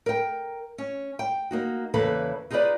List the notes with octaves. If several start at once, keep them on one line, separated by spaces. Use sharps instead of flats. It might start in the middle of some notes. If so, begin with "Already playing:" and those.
A#4 G5
C#4
G5
A#3 D#4 F#4
E2 C#3 E3 A#3 A4 B4
D#4 F4 G#4 A4 B4 D5